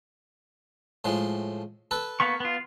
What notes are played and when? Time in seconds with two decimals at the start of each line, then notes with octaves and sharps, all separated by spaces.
1.05 A2 F3 G#3
1.91 A4 B4
2.20 A#3 B3 C#6
2.40 B3 F4